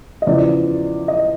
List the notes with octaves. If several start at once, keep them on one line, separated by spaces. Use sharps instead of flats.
D#5
E2 C#3 F3 D5
D#5